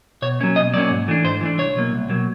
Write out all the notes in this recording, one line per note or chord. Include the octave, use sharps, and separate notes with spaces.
B2 C#5
F#3 A#3 C#4
B2 D#5
F#3 A#3 C#4 D5
G#2
E3 A3 D4
G#2 C5
E3 A3 D4
C2 C#5
B2 F#3 A#3
C2
B2 F#3 A#3